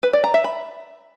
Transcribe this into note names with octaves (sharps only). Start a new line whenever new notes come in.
B4
D5
A#5
E5
B5